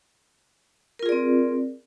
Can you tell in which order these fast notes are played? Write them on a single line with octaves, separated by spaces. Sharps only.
A#4 F4 G#4 D5 C4